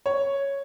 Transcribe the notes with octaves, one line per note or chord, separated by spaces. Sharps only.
C#5